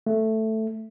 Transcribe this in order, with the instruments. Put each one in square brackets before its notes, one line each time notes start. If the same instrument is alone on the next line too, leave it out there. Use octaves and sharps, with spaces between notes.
[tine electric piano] A3